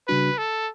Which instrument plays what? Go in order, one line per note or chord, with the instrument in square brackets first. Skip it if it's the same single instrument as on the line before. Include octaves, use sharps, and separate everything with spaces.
[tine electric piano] C#3 G3 D4 F#4 [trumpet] B4
[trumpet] A4